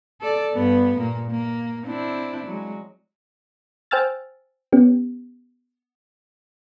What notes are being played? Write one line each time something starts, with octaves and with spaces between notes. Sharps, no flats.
A4 D5
G2 B3
A#2 A#3
A#3
C4 D4 E4
F#3 G#3
C5 G5 G#5 E6 F6 A6
B3 C#4 G4